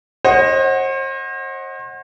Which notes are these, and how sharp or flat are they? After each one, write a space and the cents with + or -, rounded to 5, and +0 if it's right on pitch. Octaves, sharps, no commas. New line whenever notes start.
C5 +40 D#5 +0 F#5 +0